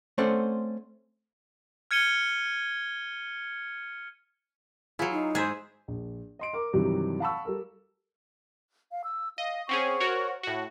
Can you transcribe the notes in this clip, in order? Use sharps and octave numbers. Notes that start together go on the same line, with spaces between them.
A3 C4 C#4 C5 D5 F#5
F6 G#6 C#7 D#7 G7
F#3 E4 F4 G#4
D#4
G#2 G#4 C5 E5
A#1
D#5 C6 D7
A#4 D6
G2 C3 D#3 E3 F#3 G3
F5 F#5 A5 B5 C#6 E6
G3 A4 A#4
F5
E6
D#5 F5
C4 C#4 G#4 C5 F#5 C#6
F#4 A#4 C#5
A2 F#4